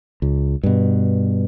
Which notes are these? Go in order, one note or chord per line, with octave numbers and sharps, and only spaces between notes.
C#2
G2 B2